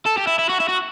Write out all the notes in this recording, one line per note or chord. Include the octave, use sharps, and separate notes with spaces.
A4
G4
E4
E4
F#4
E4
F#4